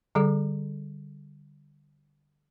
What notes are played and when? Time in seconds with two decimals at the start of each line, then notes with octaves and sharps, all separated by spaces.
0.15 D3 G3 G#4 A4